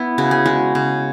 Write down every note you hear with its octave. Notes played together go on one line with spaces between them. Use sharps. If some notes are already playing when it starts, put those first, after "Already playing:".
Already playing: B3 E4
C#3 F#4
G#4
G#3 F#4
C#3